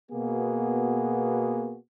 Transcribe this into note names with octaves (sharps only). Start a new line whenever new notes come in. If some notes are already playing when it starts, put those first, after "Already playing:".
B2 A#3 B3 F#4 G#4